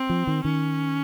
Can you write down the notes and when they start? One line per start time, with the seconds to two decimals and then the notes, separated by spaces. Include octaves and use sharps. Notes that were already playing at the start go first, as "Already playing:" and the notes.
Already playing: C4
0.09 F3
0.27 D#3
0.45 D#3 C#4